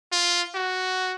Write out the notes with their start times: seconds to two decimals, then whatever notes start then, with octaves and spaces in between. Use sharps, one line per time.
0.12 F4
0.55 F#4